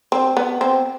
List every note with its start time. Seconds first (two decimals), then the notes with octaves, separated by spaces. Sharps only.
0.12 C4
0.37 B3
0.61 C4